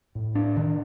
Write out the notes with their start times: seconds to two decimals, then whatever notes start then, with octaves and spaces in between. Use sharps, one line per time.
0.15 A2
0.35 D4
0.56 D#3